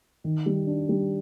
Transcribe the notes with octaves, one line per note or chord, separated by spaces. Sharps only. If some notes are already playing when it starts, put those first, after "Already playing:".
D#3
G3
D4
G3